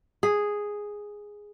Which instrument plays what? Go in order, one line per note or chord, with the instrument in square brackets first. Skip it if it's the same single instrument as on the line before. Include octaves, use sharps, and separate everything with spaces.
[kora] G#4